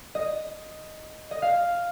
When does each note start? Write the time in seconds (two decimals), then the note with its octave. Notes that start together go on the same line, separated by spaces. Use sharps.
0.15 D#5
1.31 D#5
1.42 F5